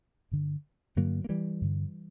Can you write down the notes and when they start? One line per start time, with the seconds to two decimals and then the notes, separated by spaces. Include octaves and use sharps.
0.31 G2 D3
0.96 G2 D3 F#3 A#3
1.24 A#3
1.29 E3 G3
1.61 G2 D3